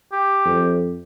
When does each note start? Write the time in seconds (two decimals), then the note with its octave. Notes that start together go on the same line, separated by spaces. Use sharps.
0.12 G4
0.45 F2